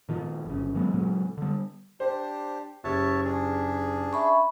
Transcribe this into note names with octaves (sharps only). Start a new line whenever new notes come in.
A#2 D#3 F3
G1 C#3
D#3 F#3 G#3 B3
A#2 C#3 F#3 G#3
D3 G3
D4 G4 C5
F#1 G4 C#5 E5 A5
D4 G#4
E5 B5 C#6